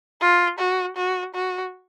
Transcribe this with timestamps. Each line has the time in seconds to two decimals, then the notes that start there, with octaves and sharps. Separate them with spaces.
0.21 F4
0.59 F#4
0.97 F#4
1.34 F#4